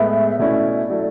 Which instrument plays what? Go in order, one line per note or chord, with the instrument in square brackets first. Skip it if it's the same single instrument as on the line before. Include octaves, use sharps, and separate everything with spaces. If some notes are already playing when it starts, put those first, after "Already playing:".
Already playing: [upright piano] A2 G#3 B3 [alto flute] E5
[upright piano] B2 A3 C#4 E4 [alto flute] D5
[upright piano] F#3 A3 E4 A4